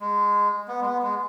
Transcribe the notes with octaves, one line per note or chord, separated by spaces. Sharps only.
G#3
B3
G#3
B3
G#3